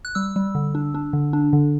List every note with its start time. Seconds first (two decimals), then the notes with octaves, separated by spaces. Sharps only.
0.05 F#6
0.15 G3 E6
0.36 G3
0.55 D3
0.75 D4
0.94 D4
1.13 D3
1.33 D4
1.53 D3